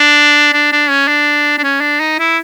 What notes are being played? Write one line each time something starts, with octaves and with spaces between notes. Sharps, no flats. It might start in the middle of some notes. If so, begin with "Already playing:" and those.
Already playing: D4
D4
D4
C#4
D4
D4
C#4
D4
D#4
E4